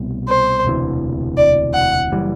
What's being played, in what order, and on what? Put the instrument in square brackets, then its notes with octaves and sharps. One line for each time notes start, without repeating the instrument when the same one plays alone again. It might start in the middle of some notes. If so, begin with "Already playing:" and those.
Already playing: [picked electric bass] C2 B2 A3
[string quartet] C5
[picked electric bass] E1 D2 C3 E3
[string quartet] D5
F#5
[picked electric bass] F#1 E3 G3